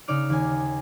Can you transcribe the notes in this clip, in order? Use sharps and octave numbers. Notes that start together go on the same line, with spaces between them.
C#3 D#4 D5 F6
D#2 G#5